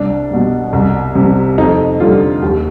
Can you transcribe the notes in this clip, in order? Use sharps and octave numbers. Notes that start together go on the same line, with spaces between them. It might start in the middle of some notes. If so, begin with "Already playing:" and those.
Already playing: C2 D4
B2 G3
C2
C3 G3
F2 D#4
D3 G3 F4
D#2 G4